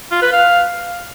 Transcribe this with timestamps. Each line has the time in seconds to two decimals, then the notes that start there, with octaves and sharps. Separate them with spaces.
0.11 F4
0.22 B4
0.32 F5